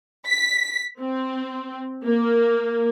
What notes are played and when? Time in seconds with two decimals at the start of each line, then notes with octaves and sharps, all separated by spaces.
0.27 B6
1.01 C4
2.04 A#3